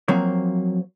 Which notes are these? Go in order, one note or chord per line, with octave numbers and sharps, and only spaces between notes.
F3 F#3 A#3 C4 C5 C#5